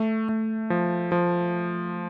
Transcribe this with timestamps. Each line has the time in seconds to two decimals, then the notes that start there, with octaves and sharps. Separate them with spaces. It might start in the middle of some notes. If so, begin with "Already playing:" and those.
Already playing: A3
0.29 A3
0.70 F3
1.12 F3